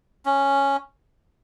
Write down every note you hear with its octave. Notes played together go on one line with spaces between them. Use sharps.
C#4